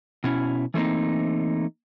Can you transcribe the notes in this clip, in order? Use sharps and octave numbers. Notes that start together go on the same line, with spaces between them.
B2 C#4 E4
E3 A3 A#3 C4 D#4